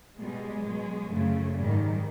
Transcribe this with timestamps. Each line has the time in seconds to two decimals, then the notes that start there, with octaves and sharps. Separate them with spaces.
0.18 B2 G3 G#3
0.63 B2 F#3
1.09 F#2 C#3 F3 A3
1.55 G#2 D#3 G3